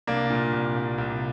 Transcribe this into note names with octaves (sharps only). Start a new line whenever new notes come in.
C2 A#3 D4
A#2
C2
C2
C2